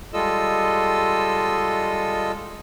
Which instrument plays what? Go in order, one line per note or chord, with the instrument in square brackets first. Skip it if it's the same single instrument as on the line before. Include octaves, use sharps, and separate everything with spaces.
[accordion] G3 G#3 F4 A4 D#5 E6